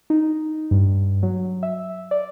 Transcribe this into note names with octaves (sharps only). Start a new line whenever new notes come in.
D#4
G2
F#3
E5
D5